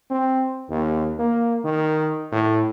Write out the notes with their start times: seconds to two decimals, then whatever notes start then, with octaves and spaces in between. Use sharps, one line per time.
0.10 C4
0.70 D#2
1.19 A#3
1.64 D#3
2.32 A2